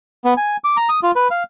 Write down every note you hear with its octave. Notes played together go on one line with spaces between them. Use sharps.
B3
G#5
D6
A#5
D#6
F4
B4
F5